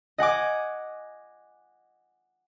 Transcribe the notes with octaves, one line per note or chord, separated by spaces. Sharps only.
D#5 F#5 G#5 D6